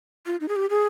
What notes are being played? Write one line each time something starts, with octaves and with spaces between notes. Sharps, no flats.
F4
D#4
G#4
G4
G#4